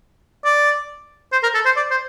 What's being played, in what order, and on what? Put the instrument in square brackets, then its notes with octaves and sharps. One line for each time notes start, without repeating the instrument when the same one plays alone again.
[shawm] D5
C5
A#4
A4
C5
D5
C5